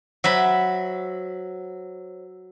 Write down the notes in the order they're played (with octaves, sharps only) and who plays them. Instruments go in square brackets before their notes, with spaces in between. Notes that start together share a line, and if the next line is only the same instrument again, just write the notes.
[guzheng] F#3 E5 B5 [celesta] C5 C#5 E6